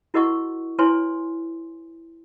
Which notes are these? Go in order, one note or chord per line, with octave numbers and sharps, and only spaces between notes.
E4 F#4 A#4 D#5 F#5 C#6
E4 B4 C#5 G#5 C6